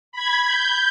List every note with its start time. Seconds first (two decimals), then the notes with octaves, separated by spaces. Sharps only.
0.12 B5 G#6
0.47 G6